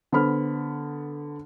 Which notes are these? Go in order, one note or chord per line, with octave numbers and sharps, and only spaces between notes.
D3 B3 C5 B5 F6